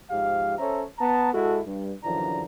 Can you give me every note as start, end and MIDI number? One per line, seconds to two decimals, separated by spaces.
0.11 0.55 44
0.11 0.55 53
0.11 0.55 67
0.11 0.55 77
0.59 0.83 61
0.59 0.83 69
0.59 0.83 72
0.59 0.83 73
0.59 0.83 76
0.59 0.83 82
0.99 1.33 59
0.99 1.33 81
0.99 1.33 82
1.33 1.59 56
1.33 1.59 64
1.33 1.59 66
1.33 1.59 69
1.66 1.93 43
2.04 2.43 42
2.04 2.43 50
2.04 2.43 52
2.04 2.43 53
2.04 2.43 62
2.04 2.43 82